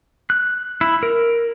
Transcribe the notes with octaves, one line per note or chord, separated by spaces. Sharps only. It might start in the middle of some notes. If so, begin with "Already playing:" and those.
F#6
E4
A#4